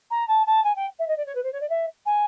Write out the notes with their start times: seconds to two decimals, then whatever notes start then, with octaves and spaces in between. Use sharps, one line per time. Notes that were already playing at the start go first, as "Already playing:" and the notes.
0.10 A#5
0.28 A5
0.46 A5
0.64 G#5
0.76 G5
0.99 E5
1.08 D#5
1.17 D5
1.26 C#5
1.35 B4
1.43 C5
1.52 C#5
1.60 D5
1.69 E5
2.06 G#5